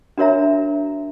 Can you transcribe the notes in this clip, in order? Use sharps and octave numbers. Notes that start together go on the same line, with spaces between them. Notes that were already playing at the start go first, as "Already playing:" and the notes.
D4 F#4 A#4 C#5 E5 A#5